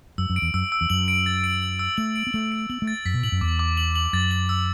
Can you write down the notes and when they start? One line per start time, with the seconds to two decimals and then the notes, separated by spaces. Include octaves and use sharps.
0.18 F#2 E6
0.30 F#2
0.36 D7
0.42 E2
0.54 F#2 E6
0.72 E6
0.81 E2
0.90 F#2 F#7
1.08 D7
1.26 A6
1.44 D7
1.62 F#7
1.79 E6
1.97 A3 F#7
2.16 D7
2.27 B3
2.33 A3 F#7
2.52 D7
2.69 B3 F#7
2.82 A3
2.87 A6
3.05 F#2 B6
3.14 B2
3.23 A2 F#7
3.32 F#2
3.41 E2 D6
3.59 D6
3.77 F#7
3.96 F#7
4.13 F#2 A6
4.31 F#7
4.49 E6